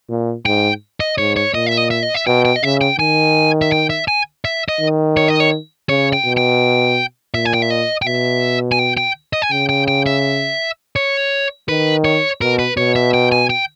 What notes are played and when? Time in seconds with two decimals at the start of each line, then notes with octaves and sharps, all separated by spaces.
0.09 A#2
0.46 G#2 G5
1.00 D#5
1.18 G#2 C#5
1.36 C#5
1.54 A#2 D#5
1.66 E5
1.77 D#5
1.91 E5
2.03 D#5
2.14 E5
2.26 B2 G5
2.45 G5
2.56 D#5
2.63 C#3 E5
2.81 G5
2.99 D#3 G#5
3.62 E5
3.72 G5
3.90 E5
4.08 G#5
4.45 E5
4.69 D#5
4.81 D#3
5.17 C#5
5.28 D#5
5.40 C#5
5.89 C#3 C#5
6.13 G5
6.25 B2
6.37 G5
7.34 A#2 E5
7.45 G#5
7.54 G5
7.62 E5
7.70 D#5
8.02 G5
8.06 B2 E5
8.72 G#5
8.79 G5
8.97 G5
9.33 D#5
9.42 G#5
9.52 C#3 G5
9.69 G5
9.88 G5
10.06 E5
10.96 C#5
11.69 D#3 B4
12.05 C#5
12.41 B2 A#4
12.59 B4
12.77 B2 C#5
12.96 E5
13.14 G5
13.32 G#5
13.50 G5